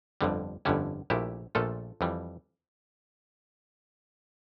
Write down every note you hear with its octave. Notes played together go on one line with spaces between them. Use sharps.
G1 F2 D3 G3
G1 F2 D3 G3 C#4 E4
A#1 A#2 A3 E4 G4
A#1 A#2 A3 F4 A4
F2 E3 G3